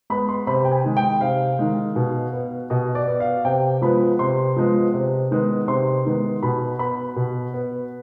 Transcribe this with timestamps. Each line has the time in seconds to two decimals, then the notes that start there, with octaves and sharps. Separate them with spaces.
0.10 G#3 B3 B5
0.29 C6
0.47 C3 B5
0.65 G5
0.72 G#5
0.84 D#3 G#3
0.97 G5
1.21 C3 F5
1.59 D#3 G#3
1.96 B2
2.33 B3
2.70 B2 D#5
2.95 D5
3.07 B3
3.20 F5
3.45 C3 G5
3.82 F3 G#3 B3 B5
4.19 C3 C6
4.56 F3 G#3 B3
4.94 C3
5.31 D#3 G#3 B3
5.68 C3 C6
6.05 D#3 G#3 B3
6.43 B2 B5
6.79 B3 B5
7.16 B2
7.54 B3